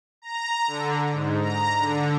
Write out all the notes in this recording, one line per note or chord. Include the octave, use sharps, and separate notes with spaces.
A#5
D3
G#2
A#5
D3